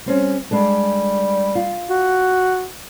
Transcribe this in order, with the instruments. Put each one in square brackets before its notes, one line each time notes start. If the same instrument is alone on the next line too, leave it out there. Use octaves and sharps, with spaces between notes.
[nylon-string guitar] G3 C4 C#4
[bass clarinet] G3 [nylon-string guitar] G#3 D4 A4
[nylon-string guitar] F4
[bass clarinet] F#4